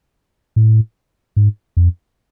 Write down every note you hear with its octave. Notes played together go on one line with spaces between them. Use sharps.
A2
G#2
F2